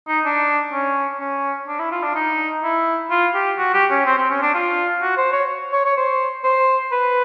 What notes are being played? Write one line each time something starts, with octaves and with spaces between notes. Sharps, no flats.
D#4
D4
C#4
C#4
D4
E4
F4
D4
D#4
E4
F4
G4
F#4
G4
C#4
C4
C4
C#4
D4
F4
F#4
C5
C#5
C#5
C#5
C5
C5
B4